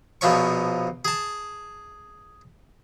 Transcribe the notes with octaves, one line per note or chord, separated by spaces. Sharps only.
A#1 B2 F3 C#4 C#6
G#4 A5